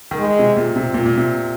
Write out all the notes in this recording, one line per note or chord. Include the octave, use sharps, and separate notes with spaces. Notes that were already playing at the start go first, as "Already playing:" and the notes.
D#3
G#3
C3
A#2
C3
A#2
A#2
C3